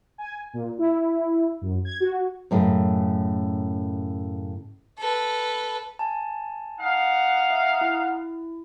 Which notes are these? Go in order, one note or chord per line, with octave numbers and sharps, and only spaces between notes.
G#5
A#2
E4
F#2
G#6
F#4
F#2 A2 C#3
A4 B4
G#5 A5
D#4 F5 F#5
E5
E4